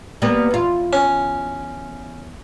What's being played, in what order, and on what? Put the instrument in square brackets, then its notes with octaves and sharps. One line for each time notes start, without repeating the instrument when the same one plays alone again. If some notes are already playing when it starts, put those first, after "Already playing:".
[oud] G3 A#3 B3
E2 F4
[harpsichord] C#4